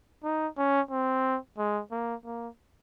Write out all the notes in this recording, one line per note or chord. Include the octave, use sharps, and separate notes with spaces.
D#4
C#4
C4
G#3
A#3
A#3